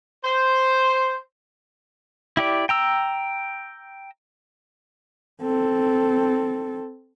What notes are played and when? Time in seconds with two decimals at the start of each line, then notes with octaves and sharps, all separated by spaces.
0.24 C5
2.37 E4 G4 D5
2.69 G5 A#5 E6
5.42 C4 A4